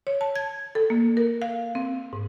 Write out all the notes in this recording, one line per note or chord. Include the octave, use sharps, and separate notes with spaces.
C#5
A5
G#6
A4
A#3
A#4
F5
C4
G#2